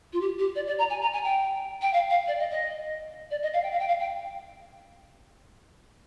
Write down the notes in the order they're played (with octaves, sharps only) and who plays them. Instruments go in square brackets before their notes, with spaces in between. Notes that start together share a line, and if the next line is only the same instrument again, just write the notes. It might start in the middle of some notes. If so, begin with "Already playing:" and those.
[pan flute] F4
G4
G4
D5
D5
A#5
G#5
A#5
G#5
G5
G5
F5
F5
D5
D#5
D#5
D5
D#5
F5
G5
F5
G5
F5
G5